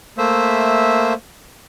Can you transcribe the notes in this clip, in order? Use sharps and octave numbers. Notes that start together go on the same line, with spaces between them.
A3 A#3 C5 E5